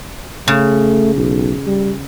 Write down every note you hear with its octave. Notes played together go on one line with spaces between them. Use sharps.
C#3 A3
B1
G3